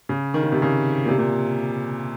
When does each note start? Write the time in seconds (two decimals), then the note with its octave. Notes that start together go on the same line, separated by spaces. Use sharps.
0.09 C#3
0.34 D#3
0.43 C#3
0.52 C3
0.62 C#3
1.05 A#2
1.09 C3
1.18 A#2